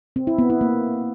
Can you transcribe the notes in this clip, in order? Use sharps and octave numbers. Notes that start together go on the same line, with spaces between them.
C4
E4
B3
E4
A#3